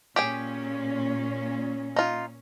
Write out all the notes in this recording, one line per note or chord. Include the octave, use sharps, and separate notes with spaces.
A#2 C#4 G4 G#4 G5
D#4 F4